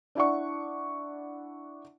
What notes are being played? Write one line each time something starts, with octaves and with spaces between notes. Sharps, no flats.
D4 E4 D5 F#5 C#6